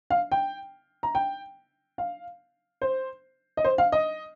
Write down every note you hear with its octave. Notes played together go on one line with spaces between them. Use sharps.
F5
G5
A#5
G5
F5
C5
D#5
C5
F5
D#5